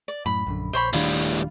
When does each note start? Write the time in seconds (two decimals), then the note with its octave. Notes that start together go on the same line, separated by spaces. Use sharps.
0.08 D5
0.26 F#2 A2 B5
0.47 A#1 F#2 D3
0.73 A#1 C5 C#5 B5
0.93 D#1 A2 D#3 G3 D4 F4